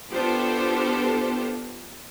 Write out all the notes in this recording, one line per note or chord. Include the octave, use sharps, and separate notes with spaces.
B3 D4 F4 G4 A4 C5